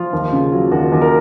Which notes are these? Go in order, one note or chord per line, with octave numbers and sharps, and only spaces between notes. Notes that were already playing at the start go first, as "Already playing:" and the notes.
Already playing: F3 F4
D#2
C#3
F#3
D#2 F#4
D#2
A#4